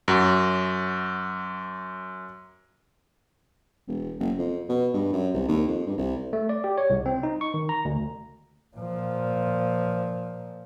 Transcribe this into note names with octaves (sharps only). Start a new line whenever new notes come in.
F#2 F#4
E1
F#1
F2
B2
G2
F#2
C2
D#2
F2
G2
C2
A3
D5
G4
C#5
C2
C4
D#4
C#6
D#3
A#5
D2
A#2 F3